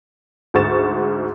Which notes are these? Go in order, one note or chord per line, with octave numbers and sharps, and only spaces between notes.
D2 G#2 F#5 C#6 A6 E7